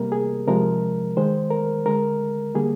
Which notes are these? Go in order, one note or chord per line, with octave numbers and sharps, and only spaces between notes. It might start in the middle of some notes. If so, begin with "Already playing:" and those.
Already playing: C3 G3 A#3 A#4
G#4
C3 F3 G#3 A#4
D#3 G#3 C5
A#4
D3 G#3 A#4
D3 G3 A#3 G#4